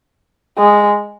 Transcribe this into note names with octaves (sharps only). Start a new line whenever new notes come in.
G#3